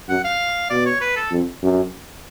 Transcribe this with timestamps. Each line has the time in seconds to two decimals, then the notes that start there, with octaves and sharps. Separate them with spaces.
0.09 F#2 F#5
0.24 F5
0.70 B2 D5
0.85 C#5
1.01 B4
1.16 A4
1.31 F2
1.62 F#2